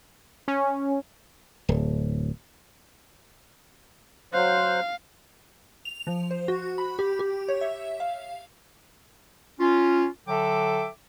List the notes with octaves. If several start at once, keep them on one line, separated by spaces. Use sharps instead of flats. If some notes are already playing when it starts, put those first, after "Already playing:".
C#4
D1
F#3 C5 F5 F#6
F7
F3
C5
F#4
B5
G4
G4
C#5
E5
F5
C#4 F4
D3 F#3 A4 E5 G5 D6